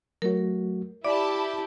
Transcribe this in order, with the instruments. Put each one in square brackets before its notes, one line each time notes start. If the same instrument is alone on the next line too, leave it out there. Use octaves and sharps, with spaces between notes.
[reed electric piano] F#3 A3 F#4 [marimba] A#4 C#5
[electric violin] E4 G4 [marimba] D5 [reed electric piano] E5 D6 [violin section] A5 B5